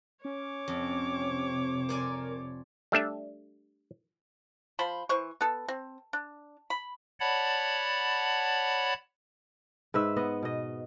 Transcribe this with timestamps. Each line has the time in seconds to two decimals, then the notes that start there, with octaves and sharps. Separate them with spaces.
0.25 C#4 C#5 D6
0.68 F2 C3
1.89 A#4 C5 D5 G#5
2.92 G3 A3 D4 E5
4.79 F3 C5 B5
5.09 E3 C5 C#6
5.41 B3 A4
5.68 C4
6.13 D4
6.70 B5
7.20 C#5 D5 F#5 A5 B5
9.94 G#2 B4 E5
10.16 B3 D#5
10.43 B2 D#5